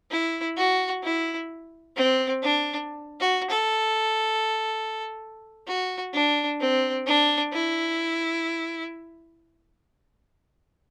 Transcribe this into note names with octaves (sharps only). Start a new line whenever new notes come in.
E4
F#4
E4
C4
D4
F#4
A4
F#4
D4
C4
D4
E4